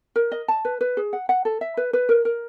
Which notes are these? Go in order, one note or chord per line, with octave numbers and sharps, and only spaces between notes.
A#4
D#5
A5
B4
B4
G#4
F#5
F#5
A4
E5
B4
B4
A#4
A#4